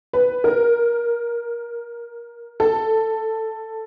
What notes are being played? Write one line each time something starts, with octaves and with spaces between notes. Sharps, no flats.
B4
A#4
A4